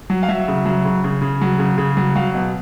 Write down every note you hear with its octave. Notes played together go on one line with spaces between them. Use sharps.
F#3
F5
F#3 E5
C#3
F#3
C#3
C#3
C#3
F#3
C#3
C#3
F#3
F#3 F5
B2